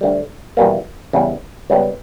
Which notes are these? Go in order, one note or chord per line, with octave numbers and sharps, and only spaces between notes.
D2 D3 G3
E2 B2 G3 A#3
E2 C#3 G3
C#2 C#3 G3 B3